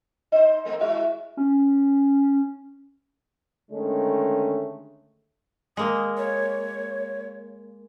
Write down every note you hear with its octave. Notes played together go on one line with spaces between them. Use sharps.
D#4 C5
A3 A#3 C4
G#3 E4 F#4
C#4
D3 D#3 G#3 A3 C#4
G#3 A#3 D#6
C#5